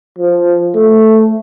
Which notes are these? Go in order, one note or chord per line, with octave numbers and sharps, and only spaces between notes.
F3
A3